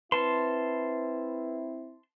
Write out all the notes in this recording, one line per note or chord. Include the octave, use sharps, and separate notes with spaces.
C4 E4 B4 A5 C6